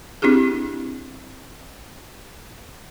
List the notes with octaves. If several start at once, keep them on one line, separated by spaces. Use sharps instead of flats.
C4 D4 E4 G4 G#4